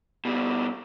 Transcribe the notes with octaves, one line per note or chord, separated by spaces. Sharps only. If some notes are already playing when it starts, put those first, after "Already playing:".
B2 G3